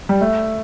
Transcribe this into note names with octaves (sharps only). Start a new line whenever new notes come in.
G3
A3